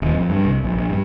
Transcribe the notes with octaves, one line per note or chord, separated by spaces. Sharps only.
D#1
F2
G2
C2
A#1
A#1
G2